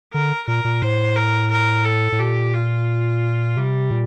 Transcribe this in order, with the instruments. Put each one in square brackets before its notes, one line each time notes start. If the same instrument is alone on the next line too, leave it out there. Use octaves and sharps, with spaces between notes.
[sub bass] D3 [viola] A#4
[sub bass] A#2 [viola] A#4
[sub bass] A#2
[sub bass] A2 [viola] C5
[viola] A#4
A#4
A4
[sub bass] A2
[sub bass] A#2 [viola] G4
[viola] F4
[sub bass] C3 [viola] G3
[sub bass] A#2